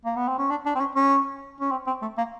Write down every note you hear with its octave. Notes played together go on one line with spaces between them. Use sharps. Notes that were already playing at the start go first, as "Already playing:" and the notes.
A#3
B3
C4
C#4
D4
D4
C4
C#4
C#4
C#4
C4
C4
A3
A#3